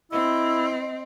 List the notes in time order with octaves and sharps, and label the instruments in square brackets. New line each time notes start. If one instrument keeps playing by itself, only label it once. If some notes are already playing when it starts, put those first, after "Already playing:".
[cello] C4 [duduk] E4 [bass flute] D#5 [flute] E6